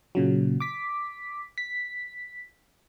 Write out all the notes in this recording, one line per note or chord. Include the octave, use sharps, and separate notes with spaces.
A#2 C#3 F#3
D6 B6
B6